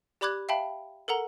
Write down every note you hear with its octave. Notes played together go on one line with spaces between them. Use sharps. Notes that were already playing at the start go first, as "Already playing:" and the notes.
G4 D5 B5 D6 F#6 G#6
E5 F5 G5 A5 B5
A4 A#4 F#5 A#5